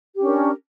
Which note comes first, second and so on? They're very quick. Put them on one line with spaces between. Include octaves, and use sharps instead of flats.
G4 C#4 D4 A#4